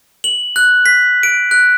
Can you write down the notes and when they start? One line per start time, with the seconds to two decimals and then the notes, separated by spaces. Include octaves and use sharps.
0.24 F#7
0.56 F#6
0.86 B6
1.23 D7
1.51 F#6